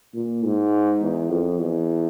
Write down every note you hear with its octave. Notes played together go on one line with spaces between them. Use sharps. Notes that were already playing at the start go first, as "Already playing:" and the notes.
A#2
G#2
E2
F2
E2